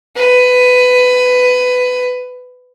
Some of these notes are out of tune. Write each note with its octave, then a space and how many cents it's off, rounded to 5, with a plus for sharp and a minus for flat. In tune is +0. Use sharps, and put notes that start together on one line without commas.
B4 +15